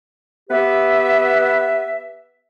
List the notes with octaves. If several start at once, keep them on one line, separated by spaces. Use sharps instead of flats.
B3 G4 B4 E5